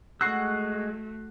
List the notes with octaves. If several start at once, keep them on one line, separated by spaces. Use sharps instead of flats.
G#3 A3 F#4 C#6 E6 F#6 C7